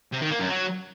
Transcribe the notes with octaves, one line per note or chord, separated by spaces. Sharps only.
C3
D#3
A#3
F#2
F#3